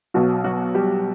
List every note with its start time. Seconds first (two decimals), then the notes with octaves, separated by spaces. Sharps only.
0.14 B1 B2 F#3 F#4
0.44 F#3 F#4
0.75 G3 G4